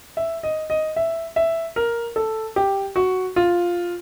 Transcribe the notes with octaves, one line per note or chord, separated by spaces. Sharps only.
E5
D#5
D#5
E5
E5
A#4
A4
G4
F#4
F4